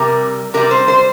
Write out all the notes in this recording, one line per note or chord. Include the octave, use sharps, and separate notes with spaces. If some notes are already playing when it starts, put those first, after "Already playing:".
Already playing: C3 G3 A#4
C3 G3 A#4
C5
C5